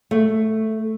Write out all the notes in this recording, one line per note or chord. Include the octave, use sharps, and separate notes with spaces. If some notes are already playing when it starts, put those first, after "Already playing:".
A3